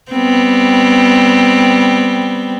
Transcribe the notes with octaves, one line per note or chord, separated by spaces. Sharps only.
G3 B3 C4